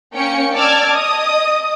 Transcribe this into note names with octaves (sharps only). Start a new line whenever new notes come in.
A#3 C#4 G5 C#7
D5 A5 D6 E6 F6 G#6
D#5 D#6